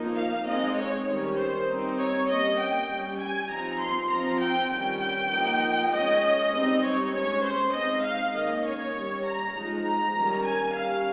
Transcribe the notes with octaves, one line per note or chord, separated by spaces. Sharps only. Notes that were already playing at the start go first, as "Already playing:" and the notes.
Already playing: F3 A#3 D#4
F5
G#3 C4 D#4 D#5
C#5
D#3 G3 C#4 C#5
C5
G3 C4 D#4
C#5
G3 A#3 C#4 D#5
G5
G3 C#4
G#5
F3 C4 D#4 A#5
C6
F3 C4 D#4 A#5
G5
D#3 G3 C#4 G5
G5
F3 A#3 D#4
G#3 D#5
C#4
G3 C4 D#4
C#5
G#3 C#4 C#5
C5
G#3 C4 D#4 D#5
F5
D#3 A#3 C#4 D#5
C#5
G3 C#4
A#5
F3 G#3 D#4
A#5
D#3 G3 C#4
G#5
G3 C#4 F5